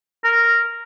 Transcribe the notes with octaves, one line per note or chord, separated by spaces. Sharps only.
A#4